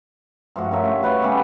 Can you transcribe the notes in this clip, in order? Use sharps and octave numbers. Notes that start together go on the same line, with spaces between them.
G2 F3 A3 F#4
G2 A#4 C#5 E5
A3
F#4 B4 C#5 F5
C#3 G3 A3 B3